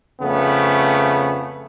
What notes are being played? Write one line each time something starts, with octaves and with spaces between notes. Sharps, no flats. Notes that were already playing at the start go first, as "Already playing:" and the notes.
F2 C#3 A3 B3